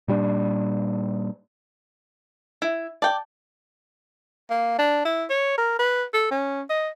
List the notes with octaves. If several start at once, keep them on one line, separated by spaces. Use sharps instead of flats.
A#2 G3 D4
E4 E5
D5 G5 A5
A#3
D4
E4
C#5
A#4
B4
A4
C#4
D#5